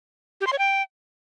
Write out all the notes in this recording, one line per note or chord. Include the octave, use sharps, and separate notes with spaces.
G4
C6
C#5
G5